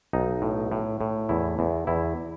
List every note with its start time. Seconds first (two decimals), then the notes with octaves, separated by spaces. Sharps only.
0.13 B1 D#4
0.42 A2
0.72 A2
1.01 A2
1.29 E2 E4
1.59 E2
1.87 E2 E4